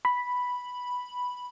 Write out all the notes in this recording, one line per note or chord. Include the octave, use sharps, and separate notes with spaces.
B5